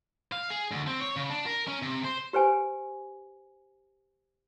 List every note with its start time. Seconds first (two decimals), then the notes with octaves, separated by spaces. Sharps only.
0.32 F5
0.50 G#4
0.71 D2
0.87 C4
1.01 C#5
1.16 C#3
1.30 D4
1.46 A#4
1.68 C#4
1.82 C3
2.04 C5
2.33 G4 B4 C5 G#5